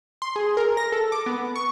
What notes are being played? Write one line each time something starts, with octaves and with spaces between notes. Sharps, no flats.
C6
G#4
A#4
A#6
A4
D6
B3
C#6